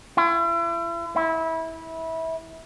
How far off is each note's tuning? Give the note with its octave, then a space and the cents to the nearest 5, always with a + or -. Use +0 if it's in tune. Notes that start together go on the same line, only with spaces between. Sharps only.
E4 +40
E4 -20